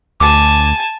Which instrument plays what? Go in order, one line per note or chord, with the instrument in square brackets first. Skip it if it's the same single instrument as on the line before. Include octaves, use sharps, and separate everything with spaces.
[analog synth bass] D2 [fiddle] G#5 A5 [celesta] D6